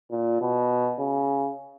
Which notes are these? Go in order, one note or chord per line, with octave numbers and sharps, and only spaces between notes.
A#2
B2
C#3